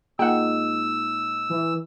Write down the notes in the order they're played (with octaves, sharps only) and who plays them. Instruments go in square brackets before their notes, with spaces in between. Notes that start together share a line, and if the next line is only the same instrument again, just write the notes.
[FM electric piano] A#2 G#3 D#4 [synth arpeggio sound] F#5 G5 [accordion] E6
[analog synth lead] E3